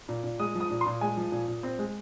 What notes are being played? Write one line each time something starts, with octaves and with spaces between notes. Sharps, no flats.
A#2
A#2
G#3 D#6
F3
D#6
A#2
C6
A#2
G#3 G#5
F3
A#2
A#2
C4
G#3